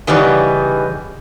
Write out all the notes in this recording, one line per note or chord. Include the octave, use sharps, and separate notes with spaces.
C#3 E3 G3 B3 D#4 D5